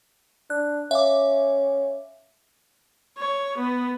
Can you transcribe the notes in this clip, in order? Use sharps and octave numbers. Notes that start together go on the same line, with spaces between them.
D4 F#6
C#4 E5 F5 D6
C#5
B3